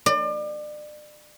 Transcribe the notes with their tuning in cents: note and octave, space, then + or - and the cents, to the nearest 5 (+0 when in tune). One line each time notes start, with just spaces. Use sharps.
D5 +35